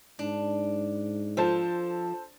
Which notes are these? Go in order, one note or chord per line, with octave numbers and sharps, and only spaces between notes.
G#2 D4
F3 A4 C5 A5